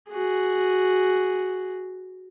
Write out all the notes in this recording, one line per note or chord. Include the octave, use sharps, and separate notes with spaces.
F#4 G#4